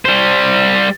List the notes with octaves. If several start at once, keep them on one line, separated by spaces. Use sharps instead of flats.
G3 C5